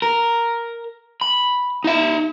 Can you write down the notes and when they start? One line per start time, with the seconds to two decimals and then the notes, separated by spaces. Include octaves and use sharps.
0.02 A#4
1.21 B5
1.84 D#4 E5